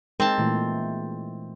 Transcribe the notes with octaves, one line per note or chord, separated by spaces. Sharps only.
G#3 C4 D#4 A#4 A5
A#2 E3 A3